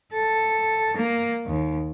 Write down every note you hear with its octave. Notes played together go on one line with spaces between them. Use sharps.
A4
A#3
D#2